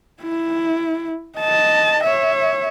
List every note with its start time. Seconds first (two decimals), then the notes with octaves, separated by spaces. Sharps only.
0.22 E4
1.38 D#5 A5
2.04 C#5 E5